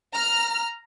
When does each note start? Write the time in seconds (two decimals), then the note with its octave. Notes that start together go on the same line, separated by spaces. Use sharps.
0.13 A#5 F6